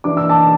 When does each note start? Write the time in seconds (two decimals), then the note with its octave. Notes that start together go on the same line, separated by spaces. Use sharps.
0.04 E3 D4 D6
0.17 E6
0.29 A5 D6